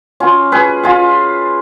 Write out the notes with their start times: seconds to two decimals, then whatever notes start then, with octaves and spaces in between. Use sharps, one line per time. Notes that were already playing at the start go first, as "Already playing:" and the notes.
0.20 C#4 F4
0.52 G#4 B4
0.84 F4 G#4